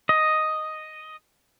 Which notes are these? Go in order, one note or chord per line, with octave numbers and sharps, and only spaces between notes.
D#5